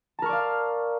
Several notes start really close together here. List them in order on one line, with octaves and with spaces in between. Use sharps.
A5 A#4 C#6 D5 F5